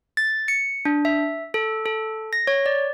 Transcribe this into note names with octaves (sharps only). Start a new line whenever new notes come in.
A6
C#7
D4
E5
A4
A4
A#6
C#5
D5